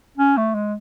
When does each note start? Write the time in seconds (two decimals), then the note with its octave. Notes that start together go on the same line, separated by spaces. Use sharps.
0.18 C#4
0.37 A3
0.55 G#3